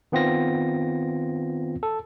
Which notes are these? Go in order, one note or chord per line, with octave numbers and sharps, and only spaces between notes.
D#3 B3 C4 F4 A#6
A4